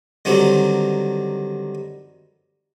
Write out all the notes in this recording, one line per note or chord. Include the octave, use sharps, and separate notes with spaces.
D3 D#3 F#3 G3 C4